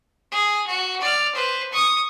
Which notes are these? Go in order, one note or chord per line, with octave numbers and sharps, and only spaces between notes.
G#4
F#4
D5 F6
B4 C5
C#6 D#6